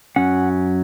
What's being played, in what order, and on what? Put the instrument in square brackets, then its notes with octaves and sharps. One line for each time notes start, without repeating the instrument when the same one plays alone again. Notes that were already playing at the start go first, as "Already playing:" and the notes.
[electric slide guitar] F#2 F#3 C#4 F#5